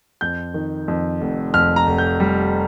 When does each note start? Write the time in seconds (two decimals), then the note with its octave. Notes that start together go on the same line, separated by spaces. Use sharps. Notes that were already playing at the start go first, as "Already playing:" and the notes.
0.21 F2 G6
0.54 D#3
0.88 F2
1.21 F1
1.54 F2 F6
1.76 A#5
1.87 F1
1.98 G6
2.20 G3